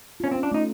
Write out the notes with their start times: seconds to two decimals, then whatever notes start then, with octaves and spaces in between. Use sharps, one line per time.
0.20 C#4 F4
0.31 C4
0.36 C#4
0.43 D4
0.52 A3 D#4